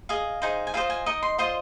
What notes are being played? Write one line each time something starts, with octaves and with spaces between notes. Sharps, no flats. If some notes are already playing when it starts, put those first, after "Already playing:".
G#4 D#5 F5
D#4 G#4 C5
G#5
F4 G#4 C5 D#5 F5
G#5
D#4 A#4 D#5 D#6
C6
F4 C5 D#5 C6